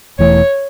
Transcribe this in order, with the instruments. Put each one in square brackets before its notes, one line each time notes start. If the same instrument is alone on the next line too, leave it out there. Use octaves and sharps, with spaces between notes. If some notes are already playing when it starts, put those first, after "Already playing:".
[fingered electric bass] E1 E2 E3 A3 [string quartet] C#5